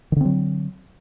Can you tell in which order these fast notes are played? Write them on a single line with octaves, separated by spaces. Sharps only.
D#3 D3 C4 F#3